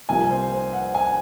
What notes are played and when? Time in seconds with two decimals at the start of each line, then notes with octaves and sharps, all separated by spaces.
0.09 C2 C3 F3 A#3 G#5
0.30 C5
0.52 C5
0.73 F#5
0.94 G#5